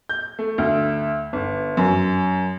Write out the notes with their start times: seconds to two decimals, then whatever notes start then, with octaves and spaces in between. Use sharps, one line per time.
0.09 G6
0.39 A3
0.58 D2
1.33 G1
1.77 F#2